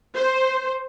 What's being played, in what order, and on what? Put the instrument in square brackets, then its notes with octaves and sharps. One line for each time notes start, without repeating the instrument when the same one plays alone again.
[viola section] C5